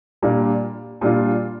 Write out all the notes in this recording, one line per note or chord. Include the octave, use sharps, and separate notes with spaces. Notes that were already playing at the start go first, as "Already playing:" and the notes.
A#2 G3 D4 F4
A#2 G3 D4 F4